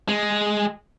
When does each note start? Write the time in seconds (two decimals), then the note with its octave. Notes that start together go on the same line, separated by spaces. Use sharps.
0.08 G#3